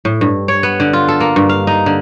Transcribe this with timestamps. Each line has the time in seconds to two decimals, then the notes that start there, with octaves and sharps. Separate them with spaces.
0.05 A2
0.21 G2
0.48 C#5
0.63 B3
0.80 D3
0.93 F4
1.08 A4
1.20 A#3
1.36 G2
1.49 F5
1.67 D#4
1.86 D3